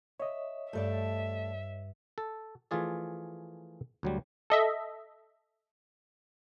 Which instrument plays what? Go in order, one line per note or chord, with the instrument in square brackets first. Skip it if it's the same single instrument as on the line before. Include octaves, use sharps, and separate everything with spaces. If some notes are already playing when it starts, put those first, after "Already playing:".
[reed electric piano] C#5 D#5 [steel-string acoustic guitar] E5
[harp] G2 G6 [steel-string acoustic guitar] A3 A4 D5 [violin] E5
[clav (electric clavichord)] A4
E3 F3 A3 F4 G#4 D5
D2 F#3 G3
[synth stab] A4 D#5 E5